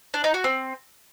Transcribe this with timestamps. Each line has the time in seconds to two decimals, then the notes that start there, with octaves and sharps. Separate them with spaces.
0.14 D4
0.24 D#4
0.34 F#4
0.44 C4